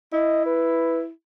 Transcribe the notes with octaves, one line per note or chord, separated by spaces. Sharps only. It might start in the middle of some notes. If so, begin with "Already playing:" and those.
E4 D#5
B4